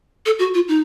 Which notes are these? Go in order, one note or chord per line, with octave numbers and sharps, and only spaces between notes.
A4
F#4
F4
D#4